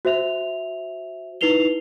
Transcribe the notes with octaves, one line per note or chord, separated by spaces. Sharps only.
F#4 C5 E5 F7
D#4 E4 B4 C7 F7 G7